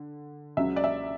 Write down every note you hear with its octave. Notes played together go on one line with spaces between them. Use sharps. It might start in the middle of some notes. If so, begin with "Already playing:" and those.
Already playing: D3
C#2 C#3 F#3 E5
D5
E5